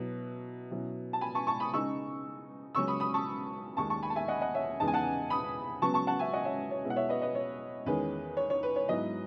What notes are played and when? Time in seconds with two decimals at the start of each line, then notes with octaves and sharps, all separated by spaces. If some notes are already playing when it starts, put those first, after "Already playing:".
Already playing: B2 F#3 E4
0.71 B2 F#3 C#4 E4
1.13 A5
1.21 G#5 B5
1.35 A5 C#6
1.47 A5 C#6
1.60 B5 D#6
1.73 C#3 G#3 D#4 C#6 E6
2.75 C#2 C#3 F#3 C#4 C#6 E6
2.88 B5 D#6
3.00 B5 D#6
3.14 A5 C#6
3.77 D#2 D#3 G#3 A5 C#6
3.90 A5 C#6
4.03 G#5 B5
4.10 A5
4.15 E5 G#5
4.28 D#5 F#5
4.41 D#5 F#5
4.55 C#5 E5
4.80 E2 C#3 G#3 B3 D#4 A5
4.87 G#5
4.94 F#5 A5
5.30 B5 D#6
5.82 C#3 F#3 B3 A5 C#6
5.94 A5 C#6
6.07 F#5 A5
6.19 E5 G#5
6.33 D#5 F#5
6.45 C#5 E5
6.71 C#5
6.84 B2 G#3 B3 E4
6.90 F#5
6.96 C#5 E5
7.09 B4 D#5
7.22 B4 D#5
7.35 C#5
7.86 E2 D#3 G#3 C#4 B4
8.37 C#5
8.50 C#5
8.63 B4
8.76 C#5
8.88 G#2 F#3 B3 E4 B4 D#5